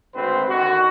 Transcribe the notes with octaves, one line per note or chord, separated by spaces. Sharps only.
G#1 D2 C4 B4 C5
D3 D#3 F#4